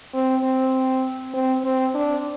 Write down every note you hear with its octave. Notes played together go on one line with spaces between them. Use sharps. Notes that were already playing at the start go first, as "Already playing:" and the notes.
C4
C4
C4
C4
D4